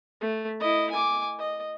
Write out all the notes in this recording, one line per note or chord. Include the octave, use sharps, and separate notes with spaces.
A3
E4 D#5
G#5 D6
D#5